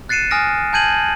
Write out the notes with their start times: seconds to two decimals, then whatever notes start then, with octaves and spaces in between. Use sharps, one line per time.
0.09 F#6 A6 C7 C#7 D#7 E7
0.31 G#5 D#6 F6 A#6 D7
0.73 G#5 A5 G6 G#6 D#7 F#7